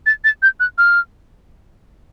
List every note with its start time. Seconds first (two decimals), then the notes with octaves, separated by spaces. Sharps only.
0.06 A6
0.24 A6
0.42 G6
0.60 F#6
0.78 F6